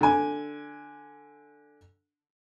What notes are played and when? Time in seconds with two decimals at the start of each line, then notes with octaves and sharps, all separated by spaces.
0.01 D3 G#5